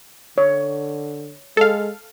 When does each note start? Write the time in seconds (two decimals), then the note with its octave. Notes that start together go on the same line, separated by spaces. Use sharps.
0.38 D3 C#5
1.57 G#3 A4 F5